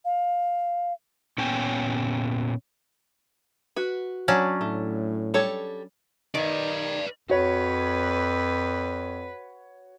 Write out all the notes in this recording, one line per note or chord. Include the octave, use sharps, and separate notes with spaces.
F5
A#2 B3 C#4 C#5 G5 G#5
F#4 B4
F#3 C#4 D4
A2 A3
G3 A4 C#5
D#3 B4 D5
F2 F#4 B4 C#5